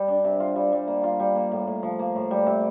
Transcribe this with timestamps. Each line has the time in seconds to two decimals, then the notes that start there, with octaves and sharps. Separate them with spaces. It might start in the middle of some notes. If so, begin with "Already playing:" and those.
Already playing: G3
0.08 D4
0.24 C3
0.40 F4
0.56 G3
0.72 G3
0.88 A#3
1.04 F4
1.19 G3
1.35 A#3
1.52 A2
1.67 A2
1.83 F3
1.99 A#3
2.16 A2
2.31 G3
2.46 C3